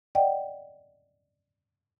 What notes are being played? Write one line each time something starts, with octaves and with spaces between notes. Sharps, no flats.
D5 D#5 F#5 G5